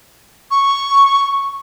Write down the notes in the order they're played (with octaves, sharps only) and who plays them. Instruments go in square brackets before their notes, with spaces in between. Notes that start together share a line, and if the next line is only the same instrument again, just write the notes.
[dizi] C#6